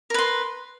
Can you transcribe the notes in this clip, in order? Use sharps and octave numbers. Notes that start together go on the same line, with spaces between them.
A#4 B4 C6